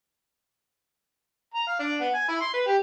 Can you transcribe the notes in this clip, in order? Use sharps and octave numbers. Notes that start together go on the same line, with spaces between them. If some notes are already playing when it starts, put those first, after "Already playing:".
A#5
F5
D4
B3
G#5
E4
C6
B4
G4